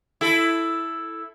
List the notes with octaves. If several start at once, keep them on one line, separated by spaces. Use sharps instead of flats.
E4 A4